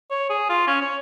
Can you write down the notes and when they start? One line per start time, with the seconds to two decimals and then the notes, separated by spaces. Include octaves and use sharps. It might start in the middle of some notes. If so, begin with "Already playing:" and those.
0.10 C#5
0.29 G#4
0.49 F4
0.67 C#4
0.81 C#5